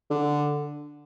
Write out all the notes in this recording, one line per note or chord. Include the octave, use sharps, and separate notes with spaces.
D3